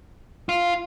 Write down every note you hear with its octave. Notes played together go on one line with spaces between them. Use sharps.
F4